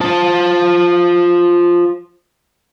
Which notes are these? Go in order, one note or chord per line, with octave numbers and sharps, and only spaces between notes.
F4 C5 A5